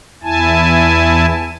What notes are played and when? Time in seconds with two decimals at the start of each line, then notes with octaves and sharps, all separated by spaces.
0.23 E2 E4 G#5 A5